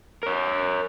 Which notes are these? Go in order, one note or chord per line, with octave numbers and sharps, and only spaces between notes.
A#4 C#5